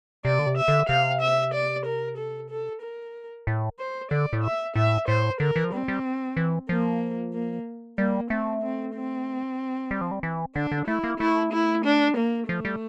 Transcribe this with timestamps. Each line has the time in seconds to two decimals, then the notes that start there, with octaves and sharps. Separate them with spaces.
0.25 C3 D5
0.39 D3
0.46 C3
0.57 E5
0.68 D3
0.89 C3 F5
1.21 E5
1.54 D5
1.85 A#4
2.17 A4
2.50 A4
2.82 A#4
3.47 A2
3.79 C5
4.11 D3 D5
4.33 A2
4.43 E5
4.75 A2 E5
5.08 A2 C5
5.40 D3 A#4
5.56 E3
5.64 F3
5.72 G3 C4
5.88 G3
6.37 E3
6.69 F3 A#3
7.33 A#3
7.98 G3 A#3
8.30 A3 C4
8.62 C4
8.95 C4
9.91 G3
10.01 F3
10.11 G3
10.23 E3
10.55 D3 D4
10.72 D3
10.87 A3 E4
11.04 A#3
11.20 A3 E4
11.53 E4
11.85 D4
12.17 A#3
12.49 F3 A3
12.65 G3